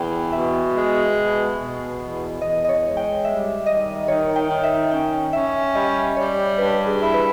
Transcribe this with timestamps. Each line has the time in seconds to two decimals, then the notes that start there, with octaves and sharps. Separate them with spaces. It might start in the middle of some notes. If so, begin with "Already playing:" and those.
Already playing: E2 G5
0.32 B2 E5
0.75 G#3
1.16 B2
1.58 B2
2.00 E2
2.41 E2 D#5
2.64 D#5
2.69 C#5
2.83 G#3
2.97 G5
3.24 G3 E5
3.66 D#3 D#5
4.08 D#3 C#5
4.36 G5
4.49 D#3
4.63 E5
4.91 C#4 G5
5.33 C#4 E5
5.75 G3 D#5
6.16 G3 C#5
6.58 G2 B4
6.86 G#4
7.00 E4
7.14 B4